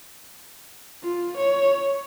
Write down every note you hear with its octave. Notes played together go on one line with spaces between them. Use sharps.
F4
C#5